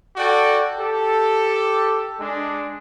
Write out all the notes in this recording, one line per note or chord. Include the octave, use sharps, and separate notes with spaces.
F#4 A4 D5 G5
G4 A4
G#3 D4